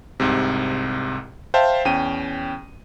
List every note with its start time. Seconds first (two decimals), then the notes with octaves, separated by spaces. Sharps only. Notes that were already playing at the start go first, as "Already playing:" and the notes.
0.20 C2 G#2 C3
1.54 C5 E5 F5 G5 A5
1.85 E2 C#4 G5 D#7